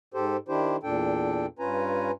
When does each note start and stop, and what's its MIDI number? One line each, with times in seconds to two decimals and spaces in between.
0.14 0.37 44
0.14 0.37 67
0.14 0.37 69
0.14 0.37 72
0.49 0.76 51
0.49 0.76 62
0.49 0.76 64
0.49 0.76 67
0.49 0.76 72
0.83 1.46 40
0.83 1.46 46
0.83 1.46 62
0.83 1.46 69
0.83 1.46 79
1.59 2.11 43
1.59 2.11 61
1.59 2.11 65
1.59 2.11 71
1.59 2.11 80
1.59 2.11 82